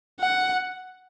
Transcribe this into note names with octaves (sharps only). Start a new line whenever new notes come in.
F#5